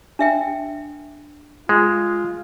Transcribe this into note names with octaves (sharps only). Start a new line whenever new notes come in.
D4 E5 G5
G#3 F4